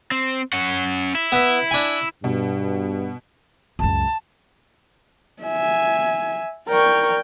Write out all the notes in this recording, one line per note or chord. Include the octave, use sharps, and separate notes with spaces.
C4
C#4 F#5
E4
B3 E5
D4 G#5
G2 B2
C#2 F#2 A5
E5 G#5
A#4 D5 G5 C#6